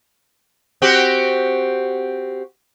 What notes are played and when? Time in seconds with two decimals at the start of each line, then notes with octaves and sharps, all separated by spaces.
0.82 C4 F#4 G4